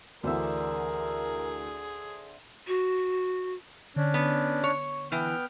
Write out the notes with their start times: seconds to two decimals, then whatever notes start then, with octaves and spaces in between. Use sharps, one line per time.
0.23 D2 D3 E3 G#4 A#4 C5 E5
2.67 F#4
3.96 D3 C#4 D4
4.14 B3
4.64 C#5
5.12 E3 B3 G5 F6